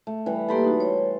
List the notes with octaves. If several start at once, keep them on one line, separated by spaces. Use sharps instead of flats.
A3
E3 G3 F#5
A#3 G4 A4 A5 B5 C6
D#4 F#4
C#5